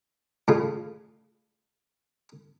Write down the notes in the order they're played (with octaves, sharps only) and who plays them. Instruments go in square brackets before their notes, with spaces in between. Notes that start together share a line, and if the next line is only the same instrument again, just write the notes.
[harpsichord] A2 C#3 F4